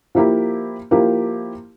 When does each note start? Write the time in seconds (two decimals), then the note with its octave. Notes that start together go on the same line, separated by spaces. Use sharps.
0.15 F3 A#3 E4 G4 A#4
0.91 F3 A#3 E4 G4 A#4